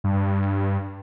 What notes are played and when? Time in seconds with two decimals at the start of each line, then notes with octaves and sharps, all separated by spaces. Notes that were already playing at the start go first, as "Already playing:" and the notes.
0.04 G2